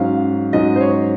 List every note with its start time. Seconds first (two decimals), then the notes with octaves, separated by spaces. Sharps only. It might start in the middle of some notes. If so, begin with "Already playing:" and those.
Already playing: G#2 F#3 C#4 F5
0.53 G#2 F#3 C#4 D#5
0.76 C5
0.81 C#5